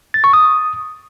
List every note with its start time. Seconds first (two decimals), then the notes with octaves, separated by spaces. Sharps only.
0.14 A6
0.24 C#6
0.33 D#6